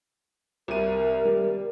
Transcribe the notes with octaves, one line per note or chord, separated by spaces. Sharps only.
C2 A#4 D#7
G3